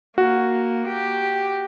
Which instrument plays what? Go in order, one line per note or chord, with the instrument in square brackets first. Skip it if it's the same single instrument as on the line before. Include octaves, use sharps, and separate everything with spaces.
[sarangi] A#3 [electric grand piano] F#4
[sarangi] G4